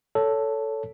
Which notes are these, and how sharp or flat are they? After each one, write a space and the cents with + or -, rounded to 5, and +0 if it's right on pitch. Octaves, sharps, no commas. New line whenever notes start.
A4 +0 C#5 +20